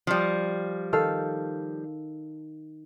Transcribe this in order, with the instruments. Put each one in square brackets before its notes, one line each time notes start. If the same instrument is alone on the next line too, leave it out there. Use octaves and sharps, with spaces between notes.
[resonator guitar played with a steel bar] F3 G3
[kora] D#3 A4 F5